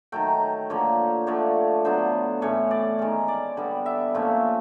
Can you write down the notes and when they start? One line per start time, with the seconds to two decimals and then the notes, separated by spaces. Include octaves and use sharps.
0.12 D#3 F#3 A3 G5
0.70 D3 F3 A#3 C#5
1.27 D3 F3 A3 D4 C#5
1.85 D3 F#3 B3 D4 C5
2.41 A2 E3 A3 C#4 C#5
2.71 D5
2.99 D#3 G#3 C#4
3.28 D5
3.57 D3 G3 B3
3.86 E5
4.15 A#2 F3 A3 C#4